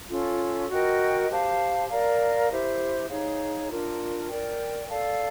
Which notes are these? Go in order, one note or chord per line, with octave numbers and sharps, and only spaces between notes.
C#4 F4 A4
F#4 A#4 D#5 G5
G4 C5 F5 A5
A#4 D5 F5 A#5
E4 G4 C5 E5
D#4 G#4 C#5 F5
D4 F4 A#4
A#4 D5 G5
A4 D5 F5 A5